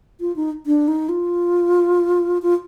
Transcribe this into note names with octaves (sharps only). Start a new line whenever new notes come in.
F4
D#4
D4
D#4
F4
F4